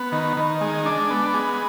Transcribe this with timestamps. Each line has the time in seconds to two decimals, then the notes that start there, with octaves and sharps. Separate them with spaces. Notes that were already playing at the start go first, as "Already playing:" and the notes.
Already playing: B3
0.12 D#3
0.37 D#3
0.61 G#3
0.86 D4
1.10 B3
1.34 G#3